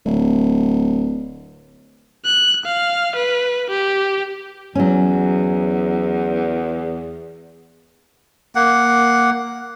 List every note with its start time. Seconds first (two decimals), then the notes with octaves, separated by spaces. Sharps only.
0.06 D1
2.25 F#6
2.66 F5
3.16 B4
3.70 G4
4.75 E2 F#3 C#4
8.55 A#3 F#5